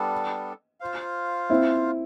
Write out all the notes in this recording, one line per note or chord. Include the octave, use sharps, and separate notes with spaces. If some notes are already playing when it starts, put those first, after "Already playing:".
Already playing: G3 B3 D4 A4
F4 C5 F5
C4 E4